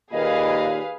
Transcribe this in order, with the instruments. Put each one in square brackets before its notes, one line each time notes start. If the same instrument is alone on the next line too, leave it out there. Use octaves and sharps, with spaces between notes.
[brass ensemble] D#2 A#2 [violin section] G#4 B4 F5 [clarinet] D#5